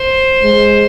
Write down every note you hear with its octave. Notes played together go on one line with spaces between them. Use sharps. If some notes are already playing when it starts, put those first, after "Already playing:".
Already playing: C5
G#3